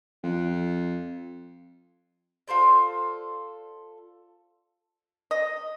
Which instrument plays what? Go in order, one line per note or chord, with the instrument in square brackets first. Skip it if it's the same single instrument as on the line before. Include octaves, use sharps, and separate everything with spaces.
[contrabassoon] F2
[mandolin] F4 A4 C5 D5
[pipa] D#5